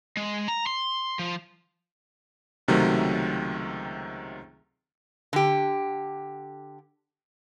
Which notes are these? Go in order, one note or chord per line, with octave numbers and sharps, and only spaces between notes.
G#3
A#5
C6
F3
C#2 C3 D#3 F#3 A3
D3 G4